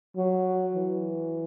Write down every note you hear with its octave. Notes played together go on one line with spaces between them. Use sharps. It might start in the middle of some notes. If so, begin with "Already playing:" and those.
F#3
E3